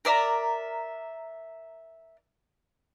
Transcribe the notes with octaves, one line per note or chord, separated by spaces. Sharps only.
A#4 D5 E5 A#5